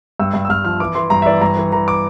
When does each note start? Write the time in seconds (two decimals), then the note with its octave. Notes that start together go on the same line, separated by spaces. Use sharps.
0.20 G2 E6
0.34 G2
0.45 E6
0.49 G2 F6
0.65 F3 F6
0.80 E3 D6
0.95 E3 C6
1.10 G2 A#5
1.22 E5
1.26 E3 D5
1.41 G2 A#5
1.57 E3
1.72 E3 A#5
1.88 D6